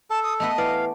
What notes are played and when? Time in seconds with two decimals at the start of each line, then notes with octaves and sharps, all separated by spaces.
0.10 A4 A5
0.23 D#6
0.40 A3 B3 B4 D#5
0.58 E3 D5 F5